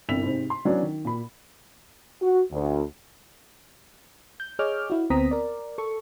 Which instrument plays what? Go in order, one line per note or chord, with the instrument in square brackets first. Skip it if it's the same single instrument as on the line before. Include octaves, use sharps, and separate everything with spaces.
[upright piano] G1 C2 E4 E6 B6 F7
G#2 C3 C5
C6
F#3 B3 C#4 D4 E4 F#4
D#3
A#2 B5
[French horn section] F#4
D2
[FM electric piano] G6
G#4 C#5 D#5 D6 F6 G6
E4 F#4
D2 B3 C4 A#5 D#6 B6
A#4 D5
A4 C#6